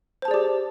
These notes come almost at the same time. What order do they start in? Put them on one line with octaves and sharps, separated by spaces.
C5 A5 G#4 D5 G4